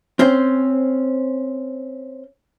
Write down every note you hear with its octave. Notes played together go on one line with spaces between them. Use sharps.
C4 C#4 C5